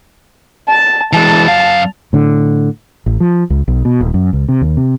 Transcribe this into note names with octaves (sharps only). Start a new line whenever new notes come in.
A5
E3 G#3 A5
F#2 F5
A2 D3
A1
F3
C#2
B1
B2
D#1
F#2
C#2
C3
D#2
C3